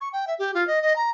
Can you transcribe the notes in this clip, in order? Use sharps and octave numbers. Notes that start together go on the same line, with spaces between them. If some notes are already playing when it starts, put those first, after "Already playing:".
C#6
G5
E5
G4
F4
D#5
D#5
A#5